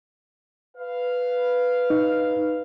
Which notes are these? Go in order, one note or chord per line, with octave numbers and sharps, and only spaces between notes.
B4 F5
D#4